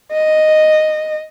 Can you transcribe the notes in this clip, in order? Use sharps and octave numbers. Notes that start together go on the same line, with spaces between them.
D#5